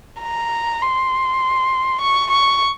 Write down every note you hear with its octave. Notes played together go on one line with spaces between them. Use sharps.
A#5
C6
C#6
C#6